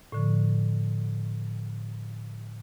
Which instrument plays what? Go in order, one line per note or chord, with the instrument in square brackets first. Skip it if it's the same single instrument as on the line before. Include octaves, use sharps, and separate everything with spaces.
[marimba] A2 D3 F3